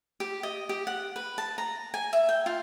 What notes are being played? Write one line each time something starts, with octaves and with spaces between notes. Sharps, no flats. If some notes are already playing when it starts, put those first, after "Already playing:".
G4
D#5
G4
F#5
B4
A5
A#5
G#5
E5
G5
F4